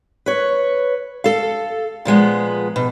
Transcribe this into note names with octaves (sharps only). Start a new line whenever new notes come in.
B4 C#5
A4 F5
A#2 F3 G#3 B3
B2